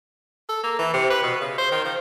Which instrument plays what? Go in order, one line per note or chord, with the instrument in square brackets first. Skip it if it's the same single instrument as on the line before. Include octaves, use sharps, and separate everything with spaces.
[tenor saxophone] A4
A#3
E3
C3
B4
B2
C#3
C5
D#3
F3